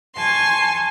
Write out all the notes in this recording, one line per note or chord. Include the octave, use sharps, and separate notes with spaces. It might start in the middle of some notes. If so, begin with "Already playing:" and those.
G#5 A5 C6 C#6